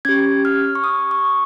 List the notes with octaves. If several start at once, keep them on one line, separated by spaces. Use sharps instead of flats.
C#4 G4 G#6
F6
C#6
D#6
C#6